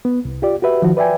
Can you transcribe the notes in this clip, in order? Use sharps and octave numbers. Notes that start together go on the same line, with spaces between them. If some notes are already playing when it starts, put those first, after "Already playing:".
B3
C2
F4 G4 D5
F#4 G4 B4 E5
D#3 F3 F#4
B4 D5 E5 G5 G#5